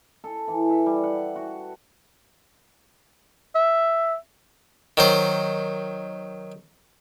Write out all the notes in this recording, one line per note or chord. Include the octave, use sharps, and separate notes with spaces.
A4
E3
E5
G3
F#5
F#4
E5
D#3 F#3 C5